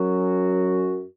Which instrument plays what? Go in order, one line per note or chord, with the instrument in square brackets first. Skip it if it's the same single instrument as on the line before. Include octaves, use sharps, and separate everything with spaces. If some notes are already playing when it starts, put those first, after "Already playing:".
Already playing: [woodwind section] F#2 F#3 C#4 F#4